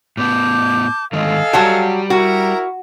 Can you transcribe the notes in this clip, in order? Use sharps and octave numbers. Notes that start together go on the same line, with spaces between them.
A2 B3 A5 D6 G6
D3 D#3 G#3 A4 D#5 F5 G#5
F#3 G3 G4 F#5 A5
E4 F#4 A#4 A#5